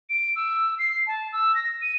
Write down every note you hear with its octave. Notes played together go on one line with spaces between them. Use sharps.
D7
E6
C7
A5
E6
A#6
D#7